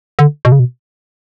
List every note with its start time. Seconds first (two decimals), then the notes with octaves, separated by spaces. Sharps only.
0.19 D3
0.45 B2
0.52 C#3
0.59 B2